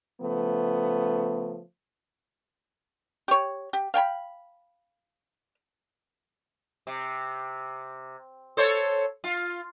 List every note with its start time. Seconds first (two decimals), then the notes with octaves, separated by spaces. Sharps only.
0.20 C#3 F3 A3 B3
3.28 G4 C#5
3.73 G4
3.94 F5 G5 G#5 B5
6.87 C3
8.57 A4 C5 C#5
9.24 F4